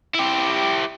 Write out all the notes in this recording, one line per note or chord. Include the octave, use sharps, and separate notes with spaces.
E4 G4